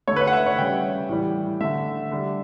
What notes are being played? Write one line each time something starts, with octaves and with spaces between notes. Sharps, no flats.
D3 A3 C#5
B4
C#5
F#5
E5
C#5
C#3 G3 G5
A2 E3 G3
D3 A3 E5
D3 G3